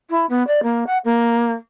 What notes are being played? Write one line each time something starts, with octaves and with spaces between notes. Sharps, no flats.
E4
B3
D5
A#3
F#5
A#3